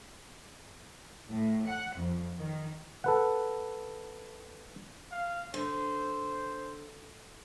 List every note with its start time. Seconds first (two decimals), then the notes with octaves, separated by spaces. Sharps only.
1.32 A2
1.67 F#5
1.98 F2
2.37 D#3
3.04 A4 B4 F#5
5.11 F5
5.54 D3 C5